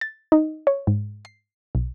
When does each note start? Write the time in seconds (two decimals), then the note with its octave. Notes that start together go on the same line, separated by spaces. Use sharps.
0.01 A6
0.32 D#4
0.67 C#5
0.87 G#2
1.25 C7
1.75 B1